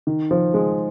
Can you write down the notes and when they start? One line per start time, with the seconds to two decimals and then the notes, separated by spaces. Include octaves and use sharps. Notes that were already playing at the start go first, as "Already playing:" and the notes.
0.07 D#3
0.31 F3
0.54 G#3